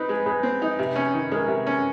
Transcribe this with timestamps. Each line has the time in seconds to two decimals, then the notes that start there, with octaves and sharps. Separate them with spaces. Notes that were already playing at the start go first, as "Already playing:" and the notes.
Already playing: C4 D#4 B4
0.09 G#3
0.26 G#3 B4
0.43 C4
0.62 D#4
0.79 C3
0.96 C#4
1.14 D#3
1.31 G#3 A#4
1.48 C3
1.67 C#4